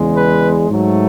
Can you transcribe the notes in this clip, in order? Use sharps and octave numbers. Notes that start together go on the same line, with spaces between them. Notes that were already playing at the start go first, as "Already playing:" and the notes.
Already playing: E2 C#3 G#3
B4
G#2 F#3 A3